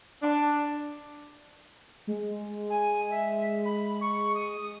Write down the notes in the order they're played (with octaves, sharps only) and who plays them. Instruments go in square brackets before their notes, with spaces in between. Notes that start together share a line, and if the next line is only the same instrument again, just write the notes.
[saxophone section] D4
[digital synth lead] G#3
[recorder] G#5
E5
B5
C#6
D#6